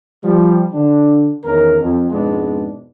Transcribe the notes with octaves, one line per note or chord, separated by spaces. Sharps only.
F3 G3
D3 D4
E2 D#3 C#4 A#4
F2
F2 G#2 B2 G#3 B3 D4